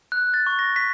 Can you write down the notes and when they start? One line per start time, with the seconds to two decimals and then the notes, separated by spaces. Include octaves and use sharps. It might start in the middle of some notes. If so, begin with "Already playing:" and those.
0.12 F#6
0.34 A6
0.47 C#6
0.59 A#6
0.76 B6